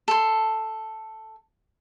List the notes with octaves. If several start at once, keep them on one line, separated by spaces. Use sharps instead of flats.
A4 C6